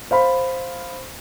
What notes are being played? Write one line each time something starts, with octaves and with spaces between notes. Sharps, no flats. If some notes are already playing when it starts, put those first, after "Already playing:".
C5 F5 B5